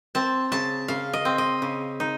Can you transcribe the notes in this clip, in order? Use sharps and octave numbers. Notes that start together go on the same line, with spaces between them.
C4 A5
C#3 A5
C#3 F5
D#5
C4
D#5
C#3
D#4